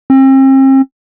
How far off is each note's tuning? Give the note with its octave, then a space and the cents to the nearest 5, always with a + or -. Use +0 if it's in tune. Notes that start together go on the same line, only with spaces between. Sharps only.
C4 +40